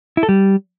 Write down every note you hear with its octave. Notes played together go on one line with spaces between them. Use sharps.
E4
A4
G3